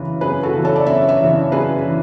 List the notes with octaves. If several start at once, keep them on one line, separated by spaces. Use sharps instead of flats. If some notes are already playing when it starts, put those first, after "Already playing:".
Already playing: F#2 C#3 E3 B4
F#2 G#4 B4
F#4 A4
C#3 E3
A4 C#5
D5
F#2 C#5 E5
C#5 E5
C#3 E3
F#2 G#4 B4
E3